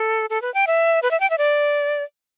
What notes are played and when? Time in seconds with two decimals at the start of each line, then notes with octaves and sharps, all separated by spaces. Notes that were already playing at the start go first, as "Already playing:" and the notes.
Already playing: A4
0.30 A4
0.42 B4
0.54 G5
0.67 E5
1.03 B4
1.11 E5
1.20 G5
1.30 E5
1.38 D5